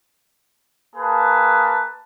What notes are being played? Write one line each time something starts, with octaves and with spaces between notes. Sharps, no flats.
A#3 G#4 B4 A5